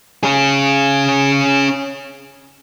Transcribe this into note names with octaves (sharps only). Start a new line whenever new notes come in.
C#4 G#4